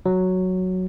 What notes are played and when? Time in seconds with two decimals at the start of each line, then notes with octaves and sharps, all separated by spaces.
0.06 F#3